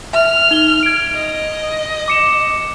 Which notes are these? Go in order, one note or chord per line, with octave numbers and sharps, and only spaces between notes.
E5 F6
D#4 F7 G7
G#6 D7
D#5
D6 C#7 E7